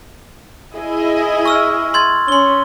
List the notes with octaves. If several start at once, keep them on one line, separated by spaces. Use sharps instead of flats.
E4 G#4 D#5
C#6 E6 F6
C6 G#6 A6
C#4 C6 G7